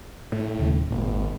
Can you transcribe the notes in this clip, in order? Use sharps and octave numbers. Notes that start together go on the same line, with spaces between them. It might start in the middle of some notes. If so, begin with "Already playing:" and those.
A2
D#1 D#2 C#3
G#1 A#2